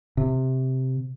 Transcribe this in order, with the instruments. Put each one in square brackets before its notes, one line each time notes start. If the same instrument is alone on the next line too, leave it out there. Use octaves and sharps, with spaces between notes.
[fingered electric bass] C3